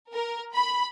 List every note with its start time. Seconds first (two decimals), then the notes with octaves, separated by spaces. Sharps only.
0.11 A#4
0.53 B5